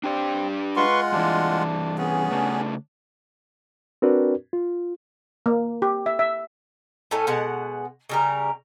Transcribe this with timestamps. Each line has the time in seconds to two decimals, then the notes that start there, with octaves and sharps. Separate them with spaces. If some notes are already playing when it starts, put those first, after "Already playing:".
0.04 C4 D4 G4 D5
0.76 G#3 F4 B4 F#5 C6 C#6
1.13 G2 E3 D4
1.98 B3 C#4 G#4
2.31 C#3 A3 D4
4.02 C4 D4 F#4 A#4 B4 D5
4.53 F4
5.46 A#3
5.82 G4
6.06 E5
6.19 E5
7.11 A2 A3 C#4 A4
7.27 B2 G#3 F#5
8.09 C#3 G3 A#4